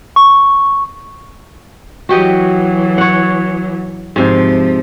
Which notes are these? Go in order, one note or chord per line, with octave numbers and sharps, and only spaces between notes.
C#6
E3 F#3 F#4 G4 D#5
C#5 F#5
G#2 C3 F3 F5